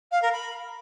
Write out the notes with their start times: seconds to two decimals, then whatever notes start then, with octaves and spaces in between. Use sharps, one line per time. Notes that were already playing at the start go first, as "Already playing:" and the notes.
0.11 F5
0.22 A#4
0.32 B5